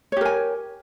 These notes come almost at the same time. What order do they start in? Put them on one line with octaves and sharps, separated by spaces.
C#5 G4 A#4 G#5